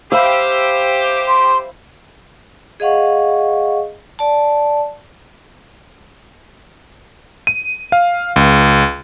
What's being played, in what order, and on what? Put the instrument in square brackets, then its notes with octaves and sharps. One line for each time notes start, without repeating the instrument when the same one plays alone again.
[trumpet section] G4 [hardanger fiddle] C5 [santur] E5 F5 B5
[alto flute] C6
[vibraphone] G#4 D#5 F5 F#5 C#6
D5 A5
[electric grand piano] D#7
F5
C#2